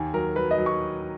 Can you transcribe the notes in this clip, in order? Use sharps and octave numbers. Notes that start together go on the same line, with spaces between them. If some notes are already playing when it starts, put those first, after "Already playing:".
Already playing: D#2 G#5
F#3 A#4
F#3 B4
D#5
F#3
C#6